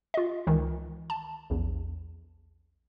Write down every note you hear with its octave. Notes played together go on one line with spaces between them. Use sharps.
F4 D#5
C#2 D#3 E3
A5
A#1 E2